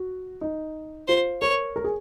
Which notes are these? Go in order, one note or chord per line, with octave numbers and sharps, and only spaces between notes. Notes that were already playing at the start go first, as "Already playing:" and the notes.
Already playing: F#4
D#4
F4 C5
A#4 C#5
A#4
G#4